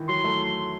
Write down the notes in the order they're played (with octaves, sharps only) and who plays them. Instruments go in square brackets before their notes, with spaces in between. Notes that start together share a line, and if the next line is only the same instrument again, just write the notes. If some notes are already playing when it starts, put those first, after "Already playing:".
Already playing: [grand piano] D#3 E3
[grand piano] F#3 [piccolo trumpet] C6
[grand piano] A3